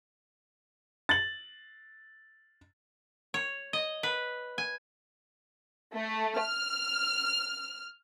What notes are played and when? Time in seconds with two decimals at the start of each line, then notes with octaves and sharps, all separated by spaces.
1.09 A6 F#7
3.34 C#5
3.73 D#5
4.03 B4
4.58 G#5
5.94 A3
6.39 F6